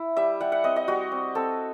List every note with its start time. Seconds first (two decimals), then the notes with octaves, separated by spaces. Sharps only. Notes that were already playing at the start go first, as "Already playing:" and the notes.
Already playing: E4
0.17 G3 E5
0.41 G3 F#5
0.52 F#5
0.64 C4 D#5
0.76 D#5
0.88 G3 F#4
1.12 C4
1.35 C4 A4